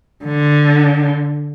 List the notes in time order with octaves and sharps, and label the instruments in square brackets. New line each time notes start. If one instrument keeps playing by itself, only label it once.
[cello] D3